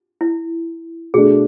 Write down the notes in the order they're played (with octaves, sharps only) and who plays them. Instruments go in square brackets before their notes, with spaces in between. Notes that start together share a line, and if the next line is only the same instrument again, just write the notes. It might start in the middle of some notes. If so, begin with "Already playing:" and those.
[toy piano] E4
[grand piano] B2 A3 D4 [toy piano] G#4